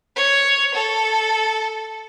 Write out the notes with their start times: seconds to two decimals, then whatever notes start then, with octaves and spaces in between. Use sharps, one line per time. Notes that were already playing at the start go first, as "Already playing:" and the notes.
0.16 C#5
0.74 A4